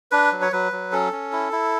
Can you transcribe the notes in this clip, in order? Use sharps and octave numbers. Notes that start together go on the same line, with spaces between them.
D4 B4
F#3
C#5
F#3 B4
F#3
C#4 A4
C#4
E4
E4